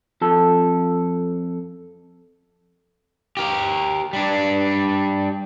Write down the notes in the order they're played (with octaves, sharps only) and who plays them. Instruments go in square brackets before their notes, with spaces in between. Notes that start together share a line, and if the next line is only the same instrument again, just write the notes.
[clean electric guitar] F2 A4
[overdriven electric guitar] G4 A#4
G3 D4